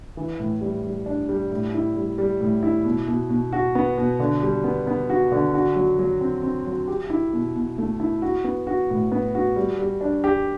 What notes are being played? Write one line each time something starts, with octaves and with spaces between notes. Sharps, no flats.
E3
A2
G3
G3
D4
G3
A2
E4
G3
G3
A2
E4
B2
B2
B2
F#4
B3
B2
D3
G3
B3
B3
F#4
D3
F#4
F#3
F#3
C4
C4
F#3
G4
E4
B2
B2
A3
E4
F#4
B3
F#4
A2
B3
F#4
G3
G3
D4
G4